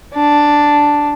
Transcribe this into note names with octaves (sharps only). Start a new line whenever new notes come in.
D4